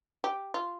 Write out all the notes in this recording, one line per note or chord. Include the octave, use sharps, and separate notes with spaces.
G4
F4